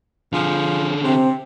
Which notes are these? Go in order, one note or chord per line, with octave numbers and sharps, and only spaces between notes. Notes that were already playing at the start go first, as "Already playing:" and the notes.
D3 F3 G#4
C3 C4